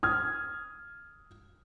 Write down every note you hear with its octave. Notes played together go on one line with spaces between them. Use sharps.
D#6 F6 G#6